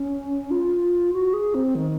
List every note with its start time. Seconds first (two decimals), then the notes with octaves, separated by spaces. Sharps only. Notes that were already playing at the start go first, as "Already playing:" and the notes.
Already playing: C#4
0.51 F4
1.13 F#4
1.33 G#4
1.54 C4
1.75 D#3